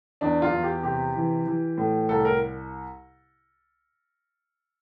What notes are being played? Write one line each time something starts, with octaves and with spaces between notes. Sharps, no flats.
E2 D4
F4
E2
G4
C3 G4
E3
E3
A2
C2 A4
A#4